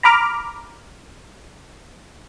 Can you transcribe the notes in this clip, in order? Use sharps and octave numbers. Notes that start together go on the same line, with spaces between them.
A#5 B5 D6 F6